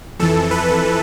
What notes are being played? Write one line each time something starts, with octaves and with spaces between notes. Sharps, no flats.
F2 E3 A4
B4